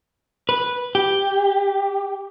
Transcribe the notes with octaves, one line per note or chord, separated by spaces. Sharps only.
B4
G4